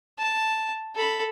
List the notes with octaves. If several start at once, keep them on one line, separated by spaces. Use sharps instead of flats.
A5
A4 B5